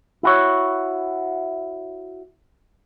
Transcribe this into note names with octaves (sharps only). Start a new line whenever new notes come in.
E4 F#4 C#5